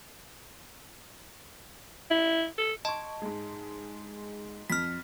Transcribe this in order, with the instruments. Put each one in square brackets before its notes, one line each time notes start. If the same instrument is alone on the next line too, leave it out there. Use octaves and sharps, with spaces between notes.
[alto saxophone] E4
A4
[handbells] D#5 A5 [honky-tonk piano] C6 C#6
[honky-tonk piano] G#2 G#3
[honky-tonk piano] F2 [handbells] F6 B6